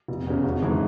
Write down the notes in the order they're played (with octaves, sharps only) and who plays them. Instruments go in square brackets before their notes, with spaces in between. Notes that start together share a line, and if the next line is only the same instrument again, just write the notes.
[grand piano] F1
E2 C#3
G#1
G#2 E3 A3